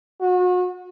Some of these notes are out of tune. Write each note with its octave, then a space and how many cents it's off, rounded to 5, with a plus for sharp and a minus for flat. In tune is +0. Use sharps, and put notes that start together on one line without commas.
F#4 -35